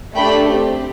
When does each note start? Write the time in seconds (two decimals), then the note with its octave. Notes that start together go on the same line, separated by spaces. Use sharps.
0.16 A3 D4 G4 G5 B5
0.50 C4 G4